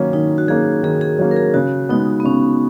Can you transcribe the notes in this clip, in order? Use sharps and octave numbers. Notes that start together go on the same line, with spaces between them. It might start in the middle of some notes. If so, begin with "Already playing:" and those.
Already playing: D#3 F#3 A#3 C#4
D#3 D#4
F#4
F#3 A#3 C#4 G#4
D#3 G#4
G#4
F#3 A#3 C#4
A#4
G#4
C#3 F#4
G#3 B3 D#4
B3
C#3 C#4